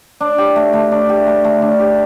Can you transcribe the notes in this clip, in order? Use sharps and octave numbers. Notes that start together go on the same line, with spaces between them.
D4
G4
A3
A3
D4
G4
A3
A3
D4
G4